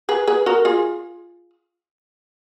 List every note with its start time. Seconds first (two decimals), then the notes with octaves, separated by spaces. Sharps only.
0.09 G#4 B4
0.28 G#4 B4
0.46 F#4 A#4
0.65 F4 G#4